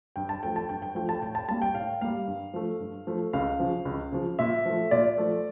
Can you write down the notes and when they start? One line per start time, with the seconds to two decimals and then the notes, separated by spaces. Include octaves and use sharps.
0.16 G2 G5
0.29 A5
0.43 F3 A3 G5
0.56 A5
0.69 G2 G5
0.82 G5
0.95 F3 A3 G5
1.09 A5
1.22 A2 G5
1.35 A5
1.48 G3 A#3 A5
1.62 G5
1.74 A2 F5
2.01 G3 A#3 F5
2.27 G2
2.54 F3 A3
2.80 G2
3.07 F3 A3
3.33 C#2 F5
3.60 C#3 F3
3.85 C#2
4.12 C#3 F3
4.39 A#2 E5
4.65 F3 A3
4.91 A#2 D5
5.18 F3 A3